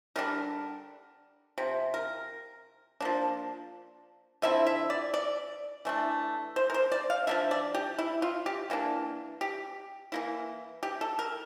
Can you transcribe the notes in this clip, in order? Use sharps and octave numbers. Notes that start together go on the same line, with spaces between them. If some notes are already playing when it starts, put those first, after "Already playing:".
D3 G3 D4 A#4
C3 F3
A#4
F3 A#3 D4
D3 F3 C4 E4 E5
E5
D5
D5
E3 A3 D4
C5
A#4
C5
D5
F5
F3 A#3 D4 E5
D5
G4
E4
F4
G4
E3 A#3 D4
G4
E3 A#3 E4
G4
A4
A#4